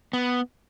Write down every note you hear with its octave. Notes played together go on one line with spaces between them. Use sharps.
B3